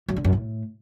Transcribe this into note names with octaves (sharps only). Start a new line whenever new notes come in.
F#2
D3
F#2
A2